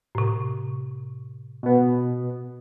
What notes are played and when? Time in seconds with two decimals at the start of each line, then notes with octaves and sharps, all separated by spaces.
0.15 A2 C3
1.63 B2 B3